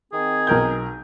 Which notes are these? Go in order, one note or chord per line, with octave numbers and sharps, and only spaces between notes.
D#3 C4 G#4
B1 A#4 G6